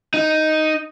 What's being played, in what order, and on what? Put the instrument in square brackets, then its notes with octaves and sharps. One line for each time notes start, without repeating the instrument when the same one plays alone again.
[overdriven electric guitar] D#4